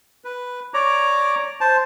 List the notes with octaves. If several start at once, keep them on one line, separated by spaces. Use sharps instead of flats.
B4
C#5 D5 A#5 D6
C5 A5